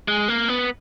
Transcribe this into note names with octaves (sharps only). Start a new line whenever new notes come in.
G#3
A#3
B3